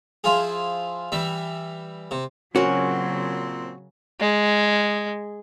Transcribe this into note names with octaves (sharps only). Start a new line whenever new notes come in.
F3 E4 F4 G#4
E3 G3 E5
C3
A#2 C#3 F#3 C4 C#4 F#4 A#4
G#3